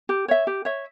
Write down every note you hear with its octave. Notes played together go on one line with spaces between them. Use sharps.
G4
C#5 E5
G4
C#5 E5